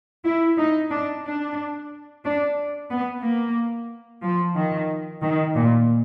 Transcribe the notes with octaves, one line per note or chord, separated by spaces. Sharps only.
E4
D#4
D4
D4
D4
B3
A#3
F3
D#3
D#3
A#2